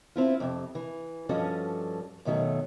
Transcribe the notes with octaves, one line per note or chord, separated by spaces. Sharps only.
C4 E4 F4
F2 C3
E3
G2 F3 C#4 F#4 A4 D#5
F#2 B2 D#3 F#3 A3